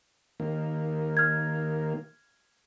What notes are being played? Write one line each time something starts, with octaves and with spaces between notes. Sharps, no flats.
D#3 A#3
F6 G#6